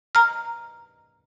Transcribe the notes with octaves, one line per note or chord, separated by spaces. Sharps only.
A#5 F6